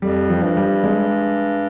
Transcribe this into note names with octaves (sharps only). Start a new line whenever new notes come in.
F2 G3
F3
G2
G3
G#3